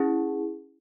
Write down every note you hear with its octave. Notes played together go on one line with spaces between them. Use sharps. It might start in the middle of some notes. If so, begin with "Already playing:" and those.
Already playing: C#4 E4 G#4